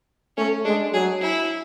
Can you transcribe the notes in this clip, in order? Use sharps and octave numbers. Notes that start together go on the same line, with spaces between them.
A3 C#4
G#3 D4
F#3 G#4
E4